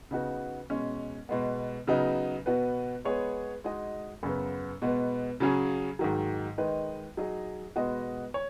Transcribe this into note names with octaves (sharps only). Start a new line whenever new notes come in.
C#3 B3 D#4 F#4
B2 G#3 C#4
B2 G#3 B3
C#3 F#3 B3 D#4 B4
B2 B3 F#4 B4
G#3 B3 G#4 C#5
G#3 D#4 F#4 D#5
F#2 C#3 B3
B2 G#3 B3
C#3 F#3 C#4 G#4
G#2 D#3 F#3
D#3 G#3 D#4 B4
F#3 D#4 G#4 D#5
B2 G#3 B3 F#4 D#5
C#5